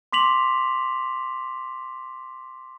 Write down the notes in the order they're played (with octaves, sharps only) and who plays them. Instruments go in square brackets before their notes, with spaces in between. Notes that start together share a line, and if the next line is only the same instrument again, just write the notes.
[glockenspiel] C6 D6 B6 F7 F#7